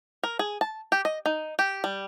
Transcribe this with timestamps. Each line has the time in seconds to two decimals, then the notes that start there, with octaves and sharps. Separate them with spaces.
0.23 A#4
0.39 G#4
0.61 A5
0.92 G4
1.05 D#5
1.26 D#4
1.59 G4
1.84 G3